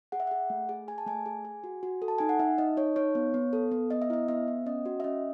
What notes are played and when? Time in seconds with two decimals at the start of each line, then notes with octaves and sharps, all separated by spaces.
0.12 G#4 F#5
0.20 E5
0.27 G#4 F#5
0.50 A3
0.69 G#4
0.88 G#4 G#5
0.98 A5
1.07 A3 G#5
1.26 G#4
1.45 G#4
1.64 F#4
1.83 F#4
2.02 A4
2.08 A5
2.18 D#4 G#5
2.29 F#5
2.39 D#4 E5
2.58 D#4 D#5
2.77 D#4 C#5
2.96 D#4 C#5
3.15 B3
3.34 B3
3.53 A4
3.72 B3
3.90 B3 D#5
4.02 E5
4.10 E4 D#5
4.28 B3 E5
4.48 B3
4.66 C#4 D#5
4.86 F#4
5.00 E5
5.04 C#4 D#5